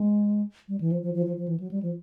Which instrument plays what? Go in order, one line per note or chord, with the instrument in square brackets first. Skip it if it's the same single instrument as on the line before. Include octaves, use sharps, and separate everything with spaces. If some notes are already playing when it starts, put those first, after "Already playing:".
Already playing: [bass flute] G#3
G3
E3
F3
F3
F3
F3
F3
E3
F#3
G3
F3